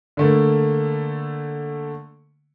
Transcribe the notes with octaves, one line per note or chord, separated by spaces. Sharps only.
D3 A3 A#3